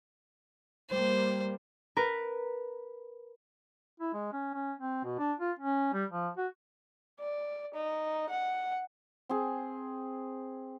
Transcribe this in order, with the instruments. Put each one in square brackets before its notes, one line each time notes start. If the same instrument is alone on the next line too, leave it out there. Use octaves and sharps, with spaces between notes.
[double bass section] G3 A#3 [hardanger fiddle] C5
[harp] A#4 B4
[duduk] E4
G#3
C#4
C#4
C4
B2
D4
F4
C#4
G3
F3
F#4
[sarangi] D5
D#4
F#5
[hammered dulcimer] C4 G#4